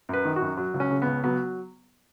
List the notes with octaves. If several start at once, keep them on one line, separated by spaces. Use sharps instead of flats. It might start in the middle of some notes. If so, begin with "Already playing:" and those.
F#2 B4
D#3
F#4
F#2
F#3
C#2
C#4
C#3
C#2 B3
F#3 B3